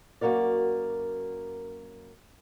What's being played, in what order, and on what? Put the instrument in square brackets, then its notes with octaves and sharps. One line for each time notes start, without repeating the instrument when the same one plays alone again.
[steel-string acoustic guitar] F#2 A#3 F#4 A#4 D5